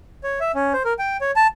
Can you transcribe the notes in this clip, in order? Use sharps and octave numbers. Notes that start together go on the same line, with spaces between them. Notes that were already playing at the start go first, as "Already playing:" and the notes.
C#5
E5
C#4
C5
A#4
G5
C#5
A5